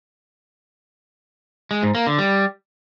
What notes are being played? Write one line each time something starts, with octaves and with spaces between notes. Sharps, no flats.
G#3
G#2
A#3
D3
G3